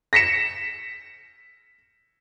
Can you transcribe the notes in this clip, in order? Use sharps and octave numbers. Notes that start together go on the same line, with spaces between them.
A#6 B6 C#7 E7